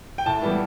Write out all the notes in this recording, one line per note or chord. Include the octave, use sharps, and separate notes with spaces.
G5
A2 A5
E3 G3 B3